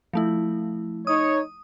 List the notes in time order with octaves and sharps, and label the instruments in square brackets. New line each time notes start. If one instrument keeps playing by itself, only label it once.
[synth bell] F3 A3 E4
[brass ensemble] D#4 C#5 [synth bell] D#6